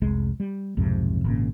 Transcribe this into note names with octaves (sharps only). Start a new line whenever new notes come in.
F1 C2 G#3
G3
B1 F2 G#2 C3
G#1 A#2 C#3